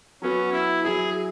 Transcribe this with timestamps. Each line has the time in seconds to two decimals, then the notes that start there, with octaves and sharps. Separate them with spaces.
0.22 F#3 B3 C#4 F#4
0.52 E4
0.83 F#3 E4 G#4